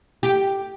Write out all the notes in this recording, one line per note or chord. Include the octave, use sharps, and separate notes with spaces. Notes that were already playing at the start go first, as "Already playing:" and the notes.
G4